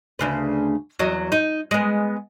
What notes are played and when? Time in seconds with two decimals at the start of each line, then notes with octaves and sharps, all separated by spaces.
0.19 D2 C#3 B4
0.99 E2 F#3 D#5
1.32 D#4
1.71 G#3 B3